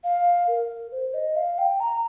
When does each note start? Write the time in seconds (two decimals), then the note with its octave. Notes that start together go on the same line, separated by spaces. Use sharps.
0.04 F5
0.48 A#4
0.92 C5
1.14 D#5
1.36 F5
1.58 G5
1.80 A#5